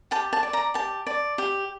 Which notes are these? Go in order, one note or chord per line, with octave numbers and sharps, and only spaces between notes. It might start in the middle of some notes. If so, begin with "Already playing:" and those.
G4 A5
A5
D5
A#5
G4 A5
D5
G4